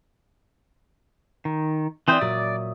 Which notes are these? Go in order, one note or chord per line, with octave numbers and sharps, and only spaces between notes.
D#3
E3 C4 C5 D5 E5 D#6
A#2 F#3 D5